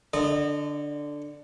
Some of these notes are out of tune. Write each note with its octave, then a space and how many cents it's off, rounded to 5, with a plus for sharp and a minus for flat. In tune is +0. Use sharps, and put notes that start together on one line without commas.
D3 +0 D#5 -30